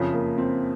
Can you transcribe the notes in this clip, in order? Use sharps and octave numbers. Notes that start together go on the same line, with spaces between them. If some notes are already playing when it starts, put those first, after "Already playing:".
Already playing: F#1 F2 C#3 F3
A#3
C4